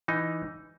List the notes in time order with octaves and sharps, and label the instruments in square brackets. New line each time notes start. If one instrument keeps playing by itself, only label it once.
[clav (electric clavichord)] E3 D#4